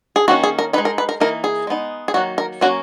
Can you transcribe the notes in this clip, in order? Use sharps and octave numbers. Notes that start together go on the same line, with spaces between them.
G#4
D#3 A#3 C#4 F#4
G#4
A#4
G#3 D#4 B4
A#4
B4
A#4
E3 A#3 D#4 A#4
G#4
G#3 B3 D#4
G#4
D#3 F#3 A#3 F#4
A#4
F#3 A#3 C#4 F#4